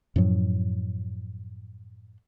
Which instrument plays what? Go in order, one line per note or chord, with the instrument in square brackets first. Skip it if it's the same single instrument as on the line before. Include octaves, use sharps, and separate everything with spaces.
[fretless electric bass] F#2 A2 F3 F#3